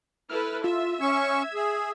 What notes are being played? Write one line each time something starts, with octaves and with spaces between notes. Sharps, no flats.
E4 A4 B4 F6
F4 E5
C#4 C#6 G#6
G#4